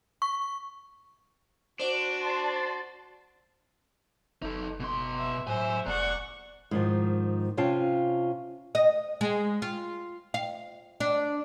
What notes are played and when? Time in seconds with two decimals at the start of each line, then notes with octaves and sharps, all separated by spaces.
0.22 C#6
1.80 D4 F#4 C5 D5
2.18 A5 C6 A6
4.42 F#1 D#4 A4
4.80 B2 C6
5.18 E5
5.47 A2 F#3 C5 E5 G#5
5.86 F1 D5 F#5 A#5 C#6
6.71 G#2 D#3 F3
7.57 C3 C#4 F4 F5 G5 A5
8.75 D#5
9.21 G#3
9.62 F4
10.34 F5
11.00 D4